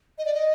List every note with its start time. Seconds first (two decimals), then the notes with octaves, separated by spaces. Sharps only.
0.18 D#5
0.25 D5
0.34 D#5